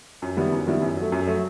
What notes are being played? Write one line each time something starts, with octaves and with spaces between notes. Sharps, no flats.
F#2
D#3 G3 B3 E4
F#2
D#3 G3 B3 E4
F#2
F#3 A3
F#2
F#3 A3